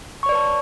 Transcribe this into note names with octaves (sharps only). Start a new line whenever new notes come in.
B4 C#5 D5 A5 C#6